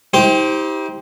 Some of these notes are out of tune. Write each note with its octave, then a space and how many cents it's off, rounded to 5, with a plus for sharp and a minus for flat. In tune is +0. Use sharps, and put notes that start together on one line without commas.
D#4 +45 G4 +0 C5 +0